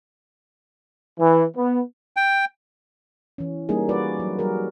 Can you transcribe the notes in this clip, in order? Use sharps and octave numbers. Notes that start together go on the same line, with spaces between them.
E3
B3
G5
E3 C#4
G3 A#3 C#4 D#4 G#4
G3 F#4 B4 D5
F#3
F#3 G3 F#4 G#4 A#4